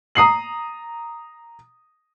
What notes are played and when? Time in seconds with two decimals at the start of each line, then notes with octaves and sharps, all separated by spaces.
0.15 A#5 D#6 C7 F#7